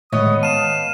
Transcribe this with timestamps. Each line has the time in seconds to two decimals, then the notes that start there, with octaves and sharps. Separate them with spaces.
0.13 A2 D#3 G#3 B3 C#5 D#5 D#6
0.43 F5 A5 D#7 E7